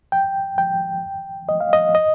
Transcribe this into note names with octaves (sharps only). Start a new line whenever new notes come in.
G5
G5
D#5
F5
D#5
D#5